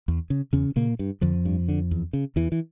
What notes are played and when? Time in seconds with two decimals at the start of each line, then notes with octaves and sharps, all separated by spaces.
0.08 E2
0.30 C#3
0.53 E2 C#3 C#4
0.76 A#2 C#3 A#3
0.99 G2
1.21 F2 D3 F3
1.45 G2
1.68 D3
1.91 E2
2.13 C#3
2.36 E2 E3
2.52 E3